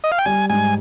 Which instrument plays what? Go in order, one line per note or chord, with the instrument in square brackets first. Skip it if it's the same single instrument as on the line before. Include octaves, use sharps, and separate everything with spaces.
[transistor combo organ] D#5
F5
G5
[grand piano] G3 [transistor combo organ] G#5
[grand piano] G#2 [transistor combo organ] G#5